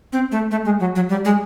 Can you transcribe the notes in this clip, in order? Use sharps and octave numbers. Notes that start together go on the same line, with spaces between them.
C4
A3
A3
G#3
F#3
F#3
G3
G#3